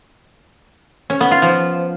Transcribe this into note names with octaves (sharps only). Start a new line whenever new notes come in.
C#4
B3
F4
F3